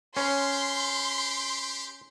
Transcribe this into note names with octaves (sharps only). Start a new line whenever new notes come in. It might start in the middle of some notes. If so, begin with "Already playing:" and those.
C#4 G4 C6